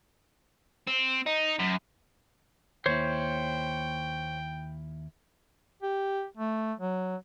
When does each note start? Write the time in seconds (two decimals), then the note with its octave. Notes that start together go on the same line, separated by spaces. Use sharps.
0.87 C4
1.26 D#4
1.59 F#2
2.86 D#2 A#3 E4 C5 C#5 G5
5.83 G4
6.37 A3
6.79 F#3